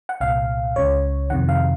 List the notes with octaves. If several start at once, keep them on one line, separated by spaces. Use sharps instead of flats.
F#5
C2 A#2 F5
C#2 C#3 C#5
F2 C3 D#3 F#5
F5